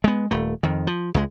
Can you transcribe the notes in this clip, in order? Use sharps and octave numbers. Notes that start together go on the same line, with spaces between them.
G#3 B3
D#1 A3
F2 D#3
F3
C#2 G#3